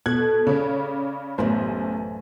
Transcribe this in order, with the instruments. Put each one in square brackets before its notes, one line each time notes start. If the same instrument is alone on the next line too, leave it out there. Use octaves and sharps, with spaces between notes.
[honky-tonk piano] B2 F#6 G#6 [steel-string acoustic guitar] A4
[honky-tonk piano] C#3 C#4 [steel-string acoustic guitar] D5
[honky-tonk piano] A1 B3 C5 [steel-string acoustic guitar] F#2 A2 C#3